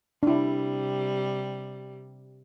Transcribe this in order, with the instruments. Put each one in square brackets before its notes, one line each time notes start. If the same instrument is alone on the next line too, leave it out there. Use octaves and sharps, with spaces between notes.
[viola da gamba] C3 G3 [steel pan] D4 E4